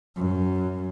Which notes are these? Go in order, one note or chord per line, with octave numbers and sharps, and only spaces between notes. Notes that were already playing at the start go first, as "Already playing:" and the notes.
F#2